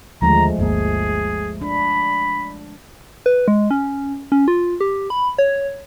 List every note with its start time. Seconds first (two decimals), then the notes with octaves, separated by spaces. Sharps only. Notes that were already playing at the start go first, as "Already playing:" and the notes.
0.22 D#2 D3 F3 G#3 A3 A#5
0.58 G1 D2 A#3 G#4
1.61 D4 B5
3.26 B4
3.48 G#3
3.71 C#4
4.32 C#4
4.48 F4
4.81 G4
5.10 B5
5.38 C#5